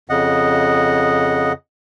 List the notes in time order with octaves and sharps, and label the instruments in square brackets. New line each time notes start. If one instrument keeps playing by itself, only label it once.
[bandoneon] F2 C#3 D#5 F#5